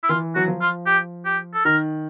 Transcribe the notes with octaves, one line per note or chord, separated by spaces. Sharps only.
E4
E3 F4
F#3 F#4
F3
F4
G4
G4
A4
D#3 A#4